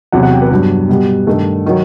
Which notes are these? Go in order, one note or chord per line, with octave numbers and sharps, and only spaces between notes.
E2 C3 F#3 F#5
F#5
G5
B4
G2 F#3 B3
B2 G3 B3
G2 D#3 A3
D#3 F#3